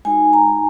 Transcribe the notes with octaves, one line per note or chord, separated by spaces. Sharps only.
G#3 D#4 F#4 G#5
A#5